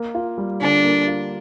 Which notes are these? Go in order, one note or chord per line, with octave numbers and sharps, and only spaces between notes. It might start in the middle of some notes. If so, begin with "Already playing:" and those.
Already playing: A#3
F4
G3
D3 D4
A#3
F4